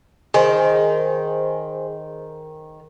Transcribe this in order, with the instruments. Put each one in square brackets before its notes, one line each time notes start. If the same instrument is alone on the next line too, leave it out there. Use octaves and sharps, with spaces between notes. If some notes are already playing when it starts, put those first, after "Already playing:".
[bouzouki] D#3 [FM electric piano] G#4 C5